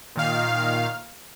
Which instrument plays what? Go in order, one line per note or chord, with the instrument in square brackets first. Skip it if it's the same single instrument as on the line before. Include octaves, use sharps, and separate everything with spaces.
[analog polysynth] A#2 D#3 F5